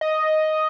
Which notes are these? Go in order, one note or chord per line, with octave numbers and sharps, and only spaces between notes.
D#5